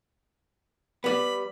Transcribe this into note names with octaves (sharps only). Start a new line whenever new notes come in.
G3 B3 B5